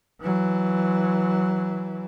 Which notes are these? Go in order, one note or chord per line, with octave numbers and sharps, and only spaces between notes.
E3 F#3